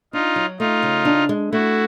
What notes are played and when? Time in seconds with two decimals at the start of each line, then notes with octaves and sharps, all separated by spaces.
0.13 D4 D#4 F4
0.36 F#3
0.59 A3 D#4 F4
0.83 C#3
1.05 D4
1.29 G#3
1.52 A3 E4 F#4